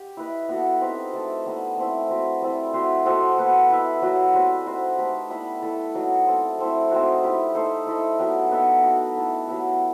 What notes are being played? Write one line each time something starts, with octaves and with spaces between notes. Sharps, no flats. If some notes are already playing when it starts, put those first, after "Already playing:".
Already playing: G4
E4 B4 D#5
B3 F#4 A4
C4 D#4 G4 B4
A3 E4 A4
G3 B3 D#4
A3 C4 E4
C4 F#4 B4
G3 C4 E4 A4
C4 F#4 C5 E5
C4 F#4 A4 D#5
B3 F#4 B4
E4 B4 E5
F#3 B3 F#4 B4
G3 C4 F#4 B4
D#4 F#4 C5 E5
A3 D#4 G4 B4
G3 B3 E4 B4
A3 E4 A4
F#3 B3 D#4 F#4
C4 E4 A4
A3 C4 E4
C4 D#4 F#4
E4 G4 B4
D#4 A4 C5
E4 A4 D#5
F#3 B3 D#4 G4
B3 D#4 A4 E5
D#4 F#4 B4
A3 E4 A4
F#3 B3 E4 G4